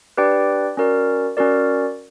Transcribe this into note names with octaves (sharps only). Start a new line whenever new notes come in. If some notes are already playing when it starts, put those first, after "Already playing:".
D4 G4 B4 D5 G5
C#4 F#4 A#4 D5
C#4 F#4 A#4 D5